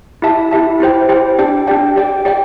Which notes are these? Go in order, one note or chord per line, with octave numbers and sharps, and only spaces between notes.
E4 G4 E5 A5
E4 G4 E5 A5
E4 G4 C5 G5
E4 G4 C5 G5
D4 G4 D5 G5
D4 G4 D5 G5
G4 D5 G5
G4 D5 G5